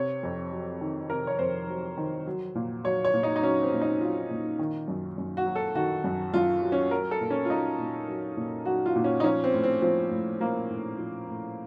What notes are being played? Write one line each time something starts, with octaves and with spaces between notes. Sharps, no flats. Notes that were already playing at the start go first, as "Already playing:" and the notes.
Already playing: C3 C#5
F2
F#3
D#3
C3 A#4
C#5
F2 C5
F#3
D#3
F#3
A#2
F#3 C#5
C#5
A#2
D#4
D#4
F#3 C#4
C4
A#2
D#4
F#3 F4
A#2
D#3
F#2
F#2
F#4
F#3
A4
D#3 F#4
F#2
F#2 F4
F#3
C#4
F#3 A#4
A4
A#2
C#4
F4
F#3 D#4
A#2
F#3
A#2
F#3 F#4
F4
A#2
C#4
D#4
F3 C#4
C4
A2
C4
F3 C4
A2
F3 A#3
A2
F3
A2